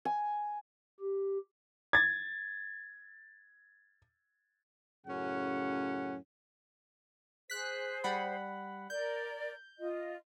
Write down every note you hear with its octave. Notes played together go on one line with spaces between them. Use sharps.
G#5
G4
G#6 A6
F#2 A2 C#3 C#4 F#5
G#4 C5 F#6 B6
G3 F#5 B5
A#4 D5 G6
F4 D#5